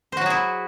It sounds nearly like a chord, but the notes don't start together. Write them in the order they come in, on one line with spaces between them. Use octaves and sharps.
C5 F#4 F#3 G#4 E4